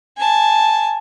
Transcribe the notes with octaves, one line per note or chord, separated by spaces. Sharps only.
G#5 A5